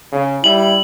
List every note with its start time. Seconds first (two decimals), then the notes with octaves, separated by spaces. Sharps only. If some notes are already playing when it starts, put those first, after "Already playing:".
0.12 C#3
0.44 G3 E4 F#7